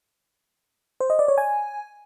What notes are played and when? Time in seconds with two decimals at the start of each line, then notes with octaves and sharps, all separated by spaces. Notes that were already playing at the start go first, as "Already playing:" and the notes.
1.00 C5
1.10 D#5
1.19 D5
1.28 C#5
1.38 G#5